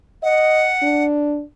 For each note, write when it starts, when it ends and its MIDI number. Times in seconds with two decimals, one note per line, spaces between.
0.23 0.69 75
0.23 1.05 78
0.82 1.43 62